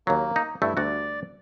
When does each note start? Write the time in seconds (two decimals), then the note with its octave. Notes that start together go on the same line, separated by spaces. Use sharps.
0.07 D#2 F#3 A#3
0.36 D#4
0.62 G2 A3 E4
0.77 D2 G3 F#4 D5